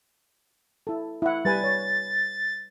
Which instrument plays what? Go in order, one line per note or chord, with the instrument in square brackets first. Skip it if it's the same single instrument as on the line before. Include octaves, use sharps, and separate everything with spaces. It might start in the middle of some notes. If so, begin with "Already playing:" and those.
[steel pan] E4 A4
E4 F#5
[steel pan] G3 B4 G#5 [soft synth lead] A6
[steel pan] C#5